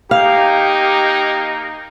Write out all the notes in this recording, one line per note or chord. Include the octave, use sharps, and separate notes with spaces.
A#3 D#4 G4 F5